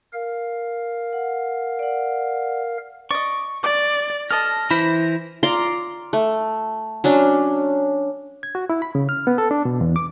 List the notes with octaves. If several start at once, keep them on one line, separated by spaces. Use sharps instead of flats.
A#4 F5
F#5
D5 F#5
D5 D#5 C#6
D5 D6
A4 D#5 A5 F6 A#6
E3 E4 C5 B5
F4 D5 A#5 C6
A3
F#3 C#4 D4
G#6
F#4
E4
B5
C#3
F6
B3
A4
D4
B2
E2
D6